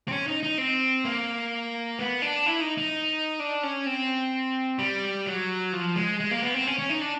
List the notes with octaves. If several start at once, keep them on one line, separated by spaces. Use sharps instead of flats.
C4
C#4
D#4
D#4
C4
A#3
B3
D4
E4
D#4
D#4
D4
C#4
C4
G3
F#3
F3
G#3
G#3
A#3
B3
C4
C#4
C#4
D#4
D4